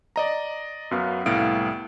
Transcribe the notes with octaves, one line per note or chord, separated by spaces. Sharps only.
D5 D#5 A#5
F#2 F#3 B3 F5
C2 A2 B3 F5 D7